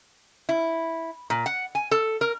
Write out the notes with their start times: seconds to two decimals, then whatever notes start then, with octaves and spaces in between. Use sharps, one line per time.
0.49 E4
1.30 A#2
1.46 F#5
1.75 G#5
1.91 A4
2.21 A#4